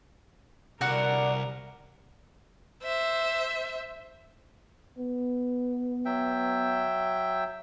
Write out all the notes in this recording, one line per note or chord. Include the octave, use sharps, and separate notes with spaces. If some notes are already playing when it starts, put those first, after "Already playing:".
C2 D3 D4 F#4 A#4 F#5
C5 E5
B3
F#3 E5 G5